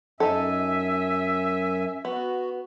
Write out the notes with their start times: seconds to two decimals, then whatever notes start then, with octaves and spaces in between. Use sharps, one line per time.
0.20 F#2 D#4 A4 E5 G#5
2.05 B3 F#4